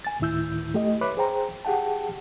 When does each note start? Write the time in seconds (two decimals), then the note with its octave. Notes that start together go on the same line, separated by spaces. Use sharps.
0.05 G#5 A6
0.20 D2 A2 D#3 E4 E6 G6
0.74 A3 G4 D#5
1.01 B4 C#5 E5 B5 D6 F#6
1.17 G#4 C5 G5 A#5
1.65 G4 G#4 F#5 G5 A5